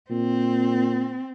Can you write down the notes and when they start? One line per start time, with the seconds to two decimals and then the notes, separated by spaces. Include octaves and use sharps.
0.11 A#2 C4